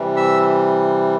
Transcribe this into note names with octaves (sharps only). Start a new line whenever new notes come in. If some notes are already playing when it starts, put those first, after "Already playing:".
Already playing: C3 E3 G3
E5 E6